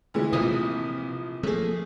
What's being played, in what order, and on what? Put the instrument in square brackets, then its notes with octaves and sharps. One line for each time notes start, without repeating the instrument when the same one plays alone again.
[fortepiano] D2 E3 G#3
[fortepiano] A#1 F3 D#6 [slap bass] C3 E3
[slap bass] F3 A#3 [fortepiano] A3 G#4